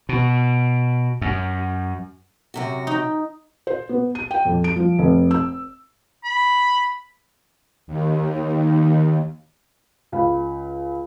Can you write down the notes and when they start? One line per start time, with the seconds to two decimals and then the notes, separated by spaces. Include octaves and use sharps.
0.09 B2
1.22 F#2
2.54 F#2 C3 F#4
2.87 D#4 G5
3.67 C5
3.89 B3
4.15 D#7
4.31 G5
4.45 F2
4.64 D7
4.76 F3
4.99 F1
5.31 E6
6.24 B5
7.87 D#2
10.12 C#2 F5 B5